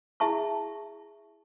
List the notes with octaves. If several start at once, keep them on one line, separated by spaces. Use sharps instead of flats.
E4 G#4 E5 A5 C#6